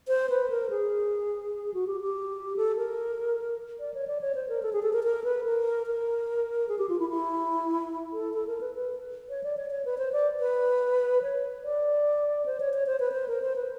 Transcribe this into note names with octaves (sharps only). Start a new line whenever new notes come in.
C5
B4
A#4
G#4
F#4
G4
G4
A4
A#4
D5
C#5
D5
C#5
C5
A#4
A4
G#4
A4
A#4
A#4
B4
A#4
A#4
G#4
G4
F4
E4
E4
A4
A4
A#4
B4
B4
C#5
D5
C#5
C#5
B4
C5
D5
B4
C#5
D5
C5
C#5
C#5
C5
B4
C5
A#4
C5
B4